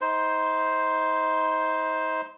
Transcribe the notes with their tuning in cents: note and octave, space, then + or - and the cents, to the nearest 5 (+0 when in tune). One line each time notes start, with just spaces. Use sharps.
D#4 +30 C5 +0